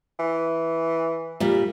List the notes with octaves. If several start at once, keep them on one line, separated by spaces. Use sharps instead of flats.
E3
A#2 G3